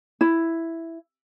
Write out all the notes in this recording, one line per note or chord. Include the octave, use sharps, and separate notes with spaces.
E4